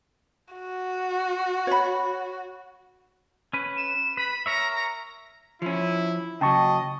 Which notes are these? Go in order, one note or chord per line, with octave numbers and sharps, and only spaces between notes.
F#4
C#5 B5
C#4 B4
E7
B4 B5
A#4 C#5 E5 A#5
A#5
F3 C#4 E4
C#3 F#3 D#5 G5 A5 C#6